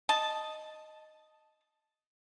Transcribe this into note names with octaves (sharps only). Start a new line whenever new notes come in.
D#5 A5